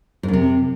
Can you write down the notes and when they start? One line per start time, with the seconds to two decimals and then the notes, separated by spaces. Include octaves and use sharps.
0.23 G#2
0.28 F#2
0.33 C3